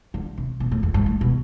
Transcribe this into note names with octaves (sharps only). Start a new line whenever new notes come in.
D3
C3
B2
A2
F2
G2
A2
B2